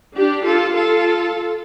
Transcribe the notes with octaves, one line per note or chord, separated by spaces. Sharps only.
D4 G4
F4 A4
F4 A4